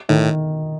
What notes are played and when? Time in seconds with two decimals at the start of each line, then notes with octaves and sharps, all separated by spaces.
0.09 A2 D#3